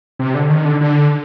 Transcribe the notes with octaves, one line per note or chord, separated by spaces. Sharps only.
C3
D3
D#3
D3
D3